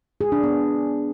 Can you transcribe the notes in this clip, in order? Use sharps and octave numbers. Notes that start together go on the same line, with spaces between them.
G#4
D4
B3